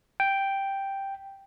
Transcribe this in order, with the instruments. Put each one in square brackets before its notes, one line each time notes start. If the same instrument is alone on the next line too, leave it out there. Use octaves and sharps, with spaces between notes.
[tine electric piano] G5